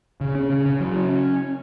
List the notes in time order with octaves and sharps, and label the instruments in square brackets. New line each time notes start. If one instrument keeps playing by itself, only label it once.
[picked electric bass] C#3
C#4
C#3
C#3
F#3
C#4